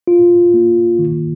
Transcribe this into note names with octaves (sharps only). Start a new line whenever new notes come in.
F4
A#3
D#3